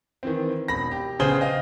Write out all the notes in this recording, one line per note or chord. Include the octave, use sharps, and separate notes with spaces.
D#3 E3 C4
E1 B5 A#6
G4
A#1 C#3 B3 G#4 C5 G7
D#5 F5